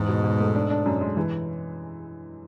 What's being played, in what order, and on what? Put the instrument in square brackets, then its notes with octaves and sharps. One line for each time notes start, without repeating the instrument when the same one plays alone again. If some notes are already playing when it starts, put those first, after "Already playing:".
Already playing: [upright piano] E2 [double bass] G#2
[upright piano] B2
B2
A3
D4
D4
F#2
G#3
E3